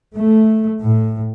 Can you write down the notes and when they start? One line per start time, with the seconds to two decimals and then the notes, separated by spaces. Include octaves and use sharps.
0.15 A3
0.82 A2